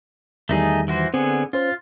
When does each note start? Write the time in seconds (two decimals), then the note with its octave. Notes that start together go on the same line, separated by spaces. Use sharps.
0.49 E2 D#3 G3 A3 D#4 G#4
0.88 E3 F#4 C5
1.14 D3 B3 C4 G#4
1.53 C#4 F4 C5